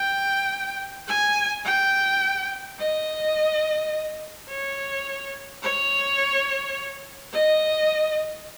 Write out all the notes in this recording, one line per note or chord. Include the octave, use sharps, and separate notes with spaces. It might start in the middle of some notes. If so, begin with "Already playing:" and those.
Already playing: G5
G#5
G5
D#5
C#5
C#5
D#5